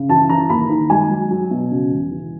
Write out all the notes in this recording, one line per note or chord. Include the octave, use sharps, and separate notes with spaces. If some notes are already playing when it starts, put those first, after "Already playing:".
Already playing: C#3
E3 A5
E3 A#5
D#2 B5
D#3
G#3 G#5
F#3
F#3
B2
C#3
E1
E3